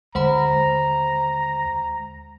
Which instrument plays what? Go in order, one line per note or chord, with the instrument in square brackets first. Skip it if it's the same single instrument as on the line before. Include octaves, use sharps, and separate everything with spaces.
[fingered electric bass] D#2 D3 D4 [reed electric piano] G#3 [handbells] C5 F#5 B5 [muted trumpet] A#5